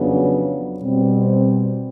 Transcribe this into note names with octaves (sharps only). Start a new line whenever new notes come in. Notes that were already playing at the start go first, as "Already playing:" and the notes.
Already playing: F2 C#3 F#3 B3 D4
B2 G3 C4